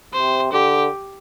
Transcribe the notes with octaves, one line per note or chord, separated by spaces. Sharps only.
C3 C5
D3 G4